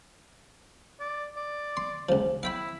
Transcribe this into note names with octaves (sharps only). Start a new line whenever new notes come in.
D5
D5
C6
C#2 F3
E4 F5 G5 B5